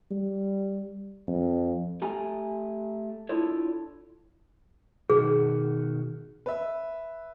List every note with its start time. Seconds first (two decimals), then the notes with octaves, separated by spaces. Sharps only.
0.11 G3
1.27 F2
2.02 A3 G4 G#5 A#5
3.29 D4 E4 F4 A4 C#5
5.10 B2 D#3 F#4 G#4
6.46 B4 E5